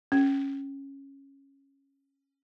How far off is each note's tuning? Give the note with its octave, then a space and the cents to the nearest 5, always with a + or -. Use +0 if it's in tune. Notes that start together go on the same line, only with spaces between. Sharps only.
C#4 -10